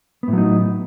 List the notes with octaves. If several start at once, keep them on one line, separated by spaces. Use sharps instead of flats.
A2 F#3 B3 D#4